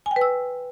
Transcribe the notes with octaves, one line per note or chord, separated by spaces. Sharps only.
G#5
G5
B4
E6